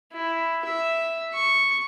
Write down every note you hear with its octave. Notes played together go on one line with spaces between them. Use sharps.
E4
E5
C#6